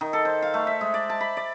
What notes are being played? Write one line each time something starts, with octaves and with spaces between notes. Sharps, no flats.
D#3
A4
C5
F5
A3
E5
G#3
D5
A5
B5
D5